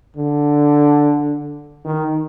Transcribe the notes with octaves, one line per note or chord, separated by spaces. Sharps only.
D3
D#3